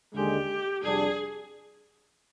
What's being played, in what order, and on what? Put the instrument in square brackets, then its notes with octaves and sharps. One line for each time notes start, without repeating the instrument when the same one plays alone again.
[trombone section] D#2 D3 G#3 [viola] G4
[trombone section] F2 C3 G3 D4 [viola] G#4